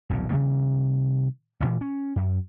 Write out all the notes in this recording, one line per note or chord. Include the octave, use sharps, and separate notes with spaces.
D#1 B1 F2
C3 D#3 G3 A#3
A1 D2 A#2 E3
C#4
F#2